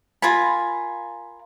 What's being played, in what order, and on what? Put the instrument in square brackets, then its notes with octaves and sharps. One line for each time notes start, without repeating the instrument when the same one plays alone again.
[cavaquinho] F4 A#4 G#5 B5